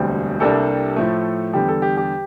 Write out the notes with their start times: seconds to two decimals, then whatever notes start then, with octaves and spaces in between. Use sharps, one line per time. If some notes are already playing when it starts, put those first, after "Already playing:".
Already playing: E1 D2 D3 G3 C4
0.40 C2 C3 G3 A#3 D4 A4
0.96 A2 F3 A3
1.53 E2 D3 G3 G4
1.68 A4
1.82 G4
1.97 G4